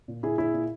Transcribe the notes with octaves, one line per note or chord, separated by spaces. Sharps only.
A#2
A#2 E4 G#4
A#2 E4 G#4
A#2